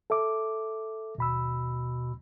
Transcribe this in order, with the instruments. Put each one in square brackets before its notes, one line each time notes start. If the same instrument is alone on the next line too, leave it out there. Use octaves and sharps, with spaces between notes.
[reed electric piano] A4 E5 D6
[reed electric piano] D#2 B5 E6 [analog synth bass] B2